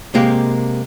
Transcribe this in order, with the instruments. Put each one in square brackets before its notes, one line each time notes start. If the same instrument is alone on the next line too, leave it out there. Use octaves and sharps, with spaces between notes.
[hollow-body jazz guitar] C3 G#3 A#3 G4